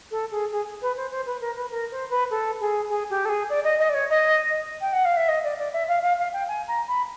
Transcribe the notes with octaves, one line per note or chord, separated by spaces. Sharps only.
A4
G#4
G#4
B4
C5
C5
B4
A#4
B4
A#4
C5
B4
A4
G#4
G#4
G4
A4
G#4
D5
D#5
D#5
D5
C#5
D#5
G5
F#5
F5
E5
D#5
D5
D5
E5
F5
F5
F5
G5
G#5
A#5
B5